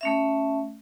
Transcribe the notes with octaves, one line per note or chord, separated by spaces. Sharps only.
A3 C#4 E5